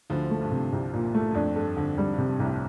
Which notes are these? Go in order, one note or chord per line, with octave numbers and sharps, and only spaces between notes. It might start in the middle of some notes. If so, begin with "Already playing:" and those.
D2 D3 F3
A3
G2
C3
C2
A#2
A3
G2
F2 D4
G2 A4
F2 D3
F2 G3
G2
C3
G2
C2 A2